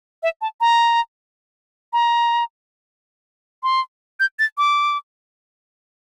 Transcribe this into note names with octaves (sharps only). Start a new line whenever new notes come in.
E5
A5
A#5
A#5
C6
G6
A6
D6